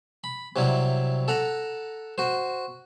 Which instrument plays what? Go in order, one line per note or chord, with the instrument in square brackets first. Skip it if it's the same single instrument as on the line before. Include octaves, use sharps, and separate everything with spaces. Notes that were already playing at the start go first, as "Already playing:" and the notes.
[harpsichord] B5
C3 F#3 G3 E4
A4 F#5 A#5
F#4 C5